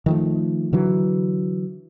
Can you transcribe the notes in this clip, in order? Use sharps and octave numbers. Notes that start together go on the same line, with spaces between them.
D#3 F3 A3
D3 E3 F#3